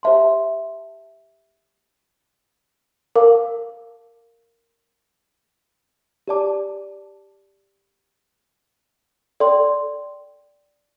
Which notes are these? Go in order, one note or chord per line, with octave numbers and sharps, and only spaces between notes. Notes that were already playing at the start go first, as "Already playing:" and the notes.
G4 C5 E5 A5 C6
A#4 F5 A5 D6
G4 D5 A5 D6
A4 D5 G5 C6